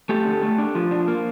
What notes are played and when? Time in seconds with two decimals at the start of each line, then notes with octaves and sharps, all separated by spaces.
0.09 A3 G4 A4
0.25 D3
0.43 A3
0.58 D4
0.75 F3
0.91 D4
1.08 A#3